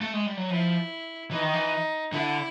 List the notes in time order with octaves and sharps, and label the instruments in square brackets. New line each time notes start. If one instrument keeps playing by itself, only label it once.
[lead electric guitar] A3
G#3
G3
F#3
[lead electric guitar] F3 [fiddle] E4
[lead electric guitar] E3 [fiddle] D#4
[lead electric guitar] D#3
E3
[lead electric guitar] D3 [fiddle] E4